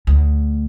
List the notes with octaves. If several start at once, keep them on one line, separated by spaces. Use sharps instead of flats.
D2